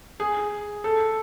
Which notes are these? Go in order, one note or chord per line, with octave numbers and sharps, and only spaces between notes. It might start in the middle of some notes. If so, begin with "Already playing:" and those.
G#4
A4